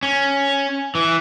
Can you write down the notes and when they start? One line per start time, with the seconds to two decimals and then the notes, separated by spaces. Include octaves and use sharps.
0.03 C#4
0.95 E3